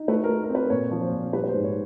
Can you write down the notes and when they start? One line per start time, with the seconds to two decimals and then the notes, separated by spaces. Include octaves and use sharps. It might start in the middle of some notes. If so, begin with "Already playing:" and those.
Already playing: D#4
0.08 A3 B4
0.24 A#4
0.29 A3
0.44 A#4
0.49 C4
0.55 B4
0.70 A#2 C#5
0.91 F3
1.01 C5
1.12 A#2
1.33 G3 B4
1.44 B4
1.48 C5
1.54 G#2
1.64 C#5